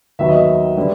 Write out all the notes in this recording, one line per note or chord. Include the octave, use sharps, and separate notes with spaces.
D#2 D#3 F#3 B3 E5
D#5
E5
D3 G3 B3